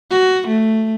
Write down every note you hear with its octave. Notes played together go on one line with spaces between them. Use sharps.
F#4
A3